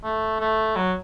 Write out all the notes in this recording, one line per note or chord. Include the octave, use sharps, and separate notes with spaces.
A3
A3
F#3